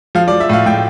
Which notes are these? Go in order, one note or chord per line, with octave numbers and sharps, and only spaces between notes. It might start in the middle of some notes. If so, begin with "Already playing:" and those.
F3 F5
D5
F3
E5
A2 F5
A2 G5